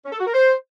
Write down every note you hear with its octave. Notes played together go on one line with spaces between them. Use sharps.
C#4
A4
F#4
A#4
C5